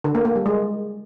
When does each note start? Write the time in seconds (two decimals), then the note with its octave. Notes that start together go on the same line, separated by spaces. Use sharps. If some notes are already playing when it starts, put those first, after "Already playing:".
0.04 D3
0.15 A#3
0.25 A#3
0.35 G3
0.46 G#3